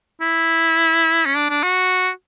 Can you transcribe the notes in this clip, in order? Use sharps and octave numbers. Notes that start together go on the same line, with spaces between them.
E4
C#4
D4
D4
F#4